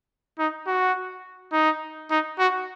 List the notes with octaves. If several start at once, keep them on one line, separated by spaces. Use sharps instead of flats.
D#4
F#4
D#4
D#4
F#4